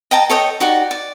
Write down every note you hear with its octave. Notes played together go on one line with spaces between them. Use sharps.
D#5 G5 A5 A#5
A4 C#5 D#5 G5
D#4 F#4 G4 D5
D5